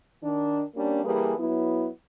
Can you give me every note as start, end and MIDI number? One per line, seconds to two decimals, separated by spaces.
0.24 0.63 51
0.24 0.63 62
0.75 1.01 55
0.75 1.01 58
0.75 1.01 61
0.75 1.01 62
1.04 1.36 52
1.04 1.36 55
1.04 1.36 58
1.04 1.36 68
1.04 1.36 69
1.04 1.36 71
1.38 1.87 54
1.38 1.87 59
1.38 1.87 64